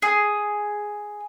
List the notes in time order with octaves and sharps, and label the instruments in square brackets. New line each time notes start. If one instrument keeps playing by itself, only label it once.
[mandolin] G#4